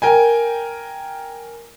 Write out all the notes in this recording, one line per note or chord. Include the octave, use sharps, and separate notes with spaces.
A#4 G5 G#5